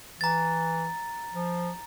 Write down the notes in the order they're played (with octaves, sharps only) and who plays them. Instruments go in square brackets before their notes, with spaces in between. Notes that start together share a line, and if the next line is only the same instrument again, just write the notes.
[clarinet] E3 [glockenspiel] A#5 A6
[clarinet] F3